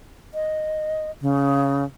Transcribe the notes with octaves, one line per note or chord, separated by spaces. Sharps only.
D#5
C#3